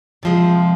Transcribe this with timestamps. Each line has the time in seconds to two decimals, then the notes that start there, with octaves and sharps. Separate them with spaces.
0.23 C3 F3 G#3